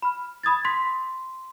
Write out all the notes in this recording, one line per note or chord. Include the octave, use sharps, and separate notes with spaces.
B5 F6
B5 D#6 G#6 A6
C6 B6